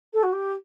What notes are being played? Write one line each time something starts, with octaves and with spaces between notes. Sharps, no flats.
A4
F#4
G4